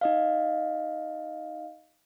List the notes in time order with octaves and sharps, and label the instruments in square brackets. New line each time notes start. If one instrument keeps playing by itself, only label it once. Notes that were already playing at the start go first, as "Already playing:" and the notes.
[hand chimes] D#4 D#5 F5